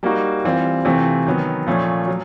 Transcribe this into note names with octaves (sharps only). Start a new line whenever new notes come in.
G3 A#3 D#4 F#4
E3 G3 C4 F4
C3 E3 A3 C4 F4
D#3 F#3 B3
A#2 F3 A3 C#4
F#3